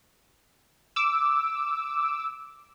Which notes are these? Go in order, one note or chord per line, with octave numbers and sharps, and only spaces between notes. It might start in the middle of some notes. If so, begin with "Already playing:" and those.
D6 E6